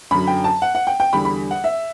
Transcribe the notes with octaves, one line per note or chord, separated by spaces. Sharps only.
F#2 D3 F#3 B5
G5
A5
F#5
F#5
G5
G5
E2 D3 G3 B5
B5
F#5
E5